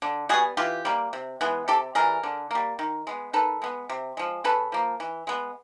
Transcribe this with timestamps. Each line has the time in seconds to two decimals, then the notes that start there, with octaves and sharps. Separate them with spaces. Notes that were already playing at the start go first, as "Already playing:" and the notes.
0.02 D3
0.29 G3 F#4 G#4
0.34 B3
0.57 E3 F4 G4
0.85 G3 A#3
1.13 C3
1.41 E3 G#3 B3
1.68 C3 G4 A4
1.95 E3 G3 G#4 A#4
2.23 D3
2.51 G3 A#3
2.79 D#3
3.07 G#3 B3
3.33 D#3 A4 B4
3.62 G#3 B3
3.89 C3
4.17 F3 G#3
4.44 C#3 A4 B4
4.72 F3 A#3
5.00 E3
5.27 G#3 B3